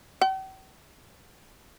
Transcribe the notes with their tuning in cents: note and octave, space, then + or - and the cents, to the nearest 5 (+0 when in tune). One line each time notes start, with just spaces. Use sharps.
G5 -45